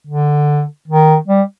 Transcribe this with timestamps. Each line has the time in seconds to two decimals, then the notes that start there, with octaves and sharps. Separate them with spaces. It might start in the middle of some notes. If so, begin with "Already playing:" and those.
0.07 D3
0.88 D#3
1.28 G3